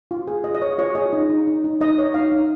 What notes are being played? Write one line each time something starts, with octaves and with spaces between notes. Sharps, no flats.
F4
G#4
G#4 D#5
D#5
C#5
F4 C#5
G#4 D#5
D#4
D#4
D#4
D#4
D#4 D#5
C#5
D#4 F5
D#4